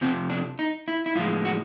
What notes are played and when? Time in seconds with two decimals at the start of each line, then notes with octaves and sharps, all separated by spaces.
0.01 F2 C3 F3 C4
0.30 D4
0.59 D#4
0.88 E4
1.06 E4
1.16 A2 F3 G#3 F4
1.45 F#4